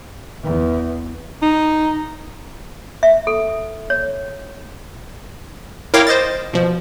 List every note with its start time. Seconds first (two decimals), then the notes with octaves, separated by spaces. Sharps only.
0.43 E2
1.42 D#4
3.03 E5
3.27 A4
3.90 C#5
5.94 E4 A#4 C#5 F5 G5 D6
6.07 C5 D#5 A6
6.53 B2 F3